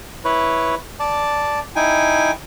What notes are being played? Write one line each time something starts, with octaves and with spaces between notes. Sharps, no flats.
E4 B4 C#5
D5 A5
D#4 E4 G5 G#5